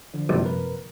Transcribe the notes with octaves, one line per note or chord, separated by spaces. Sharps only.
D3 F3
A#1 F#2 C3 F3 G3 E4
A#4 B4